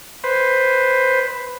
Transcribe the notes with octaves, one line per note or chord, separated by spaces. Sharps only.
B4 C5